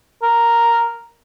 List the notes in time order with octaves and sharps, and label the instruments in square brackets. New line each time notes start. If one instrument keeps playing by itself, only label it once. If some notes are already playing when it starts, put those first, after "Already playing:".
[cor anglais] A#4